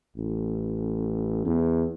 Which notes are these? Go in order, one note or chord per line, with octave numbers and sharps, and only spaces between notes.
A1
E2